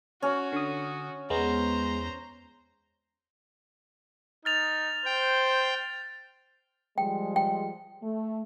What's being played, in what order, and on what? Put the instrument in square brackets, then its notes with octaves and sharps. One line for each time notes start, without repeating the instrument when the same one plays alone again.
[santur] C#4 [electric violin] F#4
[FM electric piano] D3 D#6
[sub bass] E2 [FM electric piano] G#3 B3 [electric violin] C5 A#5
[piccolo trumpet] D#4 [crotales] F6 A6 F7
[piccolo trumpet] C5 [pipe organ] G5
[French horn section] F3 G3 G#3 [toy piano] G5
[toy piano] G5
[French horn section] A3